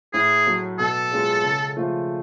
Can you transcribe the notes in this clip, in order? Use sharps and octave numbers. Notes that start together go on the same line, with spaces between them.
A2 G#4
F#3 A3
B2 A4
G#3 C#4 F4 G#4
C#3
F3 A3 F4